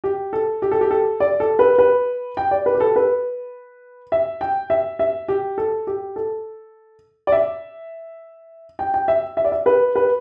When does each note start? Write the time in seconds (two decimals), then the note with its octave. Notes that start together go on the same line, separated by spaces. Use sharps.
0.04 G4
0.33 A4
0.62 G4
0.71 A4
0.81 G4
0.91 A4
1.20 D5
1.40 A4
1.59 B4
1.79 B4
2.37 G5
2.51 D5
2.66 B4
2.75 G4
2.80 A4
2.96 B4
4.12 E5
4.41 G5
4.70 E5
4.99 E5
5.28 G4
5.58 A4
5.87 G4
6.16 A4
7.27 D5
7.32 E5
8.79 G5
8.94 G5
9.08 E5
9.37 E5
9.45 D5
9.52 E5
9.66 B4
9.96 B4